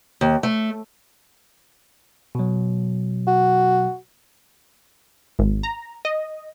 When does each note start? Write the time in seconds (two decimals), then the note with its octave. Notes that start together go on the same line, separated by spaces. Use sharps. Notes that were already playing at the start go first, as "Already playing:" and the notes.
0.21 D#2
0.43 A3
2.35 B2 F#3
3.27 F#4
5.39 G#1
5.63 A#5
6.05 D#5